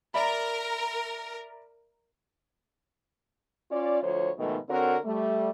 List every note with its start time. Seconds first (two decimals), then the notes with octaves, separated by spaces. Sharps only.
0.14 A#4 D5 E5 B5
3.71 C#4 F4 D5
4.02 D2 F3 C5 C#5
4.38 G#2 B2 D#3 F3 A3
4.69 D3 C4 F#4 A#4 C#5
5.04 G3 A3